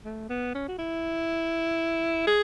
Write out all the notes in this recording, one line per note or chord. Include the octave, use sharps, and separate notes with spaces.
A3
B3
C#4
F#4
E4
G#4